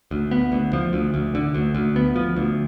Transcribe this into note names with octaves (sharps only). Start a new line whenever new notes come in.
D2
B3
D2
F3
D2
D2
D3
D2
D2
B3
F3
D2